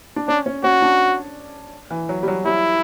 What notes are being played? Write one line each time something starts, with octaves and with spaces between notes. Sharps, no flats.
D4
C#4 D4
C#4
C#4 F#4
D4
E3
F#3
G3
F#3
G3 E4